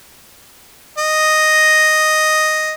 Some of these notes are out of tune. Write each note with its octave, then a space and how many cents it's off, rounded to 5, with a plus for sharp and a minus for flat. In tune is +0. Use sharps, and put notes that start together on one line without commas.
D#5 +0